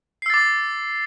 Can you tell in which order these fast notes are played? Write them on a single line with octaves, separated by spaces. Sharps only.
C7 E6 A6 D6